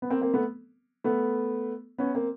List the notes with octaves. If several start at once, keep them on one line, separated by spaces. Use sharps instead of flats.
B3
A#3 C4
A#3 C4
A3 B3
A3 B3
B3 C#4
A#3 C4